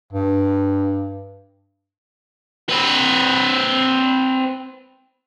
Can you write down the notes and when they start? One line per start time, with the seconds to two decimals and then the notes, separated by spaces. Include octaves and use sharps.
0.13 G2
2.69 C4 B4